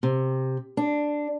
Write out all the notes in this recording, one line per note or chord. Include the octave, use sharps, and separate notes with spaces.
C3
D4